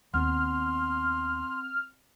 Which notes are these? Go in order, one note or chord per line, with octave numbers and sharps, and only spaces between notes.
D#2 B3 C4 F#5 C6 F6